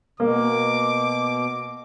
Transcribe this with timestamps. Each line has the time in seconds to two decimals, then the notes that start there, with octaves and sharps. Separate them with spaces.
0.20 B2 A#3 D6